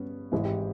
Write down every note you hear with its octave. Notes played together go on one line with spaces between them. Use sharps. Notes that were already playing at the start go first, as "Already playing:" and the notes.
Already playing: G2 B3 C#4
G#1 G#2 E3 G#3 E4
G4